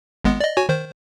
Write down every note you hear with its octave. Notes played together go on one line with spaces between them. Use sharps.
G#1 G#3 B3
D5 D#5
F#4 C#5 G#5
D#3 C5